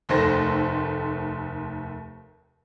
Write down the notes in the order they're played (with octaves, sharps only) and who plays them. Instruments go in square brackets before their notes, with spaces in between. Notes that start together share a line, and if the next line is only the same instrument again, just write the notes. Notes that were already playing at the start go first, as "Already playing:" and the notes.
[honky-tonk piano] F1 D#2 A3 A4 C5 A#6